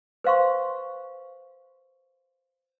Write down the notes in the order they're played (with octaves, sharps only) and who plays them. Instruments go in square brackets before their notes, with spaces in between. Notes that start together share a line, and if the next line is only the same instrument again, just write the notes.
[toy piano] B4 C5 F5 C6 C#6